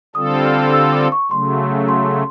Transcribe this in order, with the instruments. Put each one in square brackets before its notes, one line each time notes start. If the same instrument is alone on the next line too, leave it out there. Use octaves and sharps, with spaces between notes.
[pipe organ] D3 G3 C4 F4 A4 [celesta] D#6
[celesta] F6
E6
D6
C#6
[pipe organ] C#3 F#3 A3 [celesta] C6
[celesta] C6